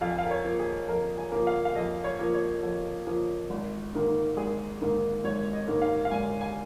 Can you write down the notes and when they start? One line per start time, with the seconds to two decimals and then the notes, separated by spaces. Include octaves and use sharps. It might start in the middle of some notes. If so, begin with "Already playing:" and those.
0.01 F2 F5
0.10 G#5
0.19 F5
0.25 A#4
0.31 C#5
0.45 F3 A#3
0.59 G#4
0.88 F2 A#4
1.18 G#5
1.32 F3 A#3
1.47 F5
1.65 F5
1.75 F2 D#5
2.04 C#5
2.19 F3 A#3
2.34 C#5
2.63 F2
3.07 F3 A#3
3.50 G#1
3.93 G#2 D#3 A#3
4.37 G#1 G#4
4.81 G#2 D#3 A#3
5.24 G#1 C#5
5.53 D#5
5.68 G#2 D#3 A#3
5.82 F5
6.05 F5
6.11 G#1 G#5
6.41 G#5